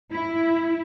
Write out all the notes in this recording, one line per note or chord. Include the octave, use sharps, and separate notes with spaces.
E4